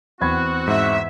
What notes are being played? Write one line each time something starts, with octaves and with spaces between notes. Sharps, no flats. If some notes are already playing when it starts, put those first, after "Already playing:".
E2 C4 F#4 B5 G#6
G#2 E5